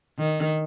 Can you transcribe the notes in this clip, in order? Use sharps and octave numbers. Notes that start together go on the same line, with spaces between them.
D#3